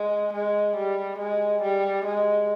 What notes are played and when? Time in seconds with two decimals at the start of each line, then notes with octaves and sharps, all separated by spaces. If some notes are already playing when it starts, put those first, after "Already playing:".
Already playing: G#3
0.33 G#3
0.76 G3
1.19 G#3
1.62 G3
2.05 G#3